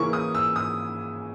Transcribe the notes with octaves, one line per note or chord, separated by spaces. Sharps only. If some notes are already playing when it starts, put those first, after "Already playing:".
Already playing: C#3 E3 A#3 C#4 E4 C#6
D#6
E6
D#6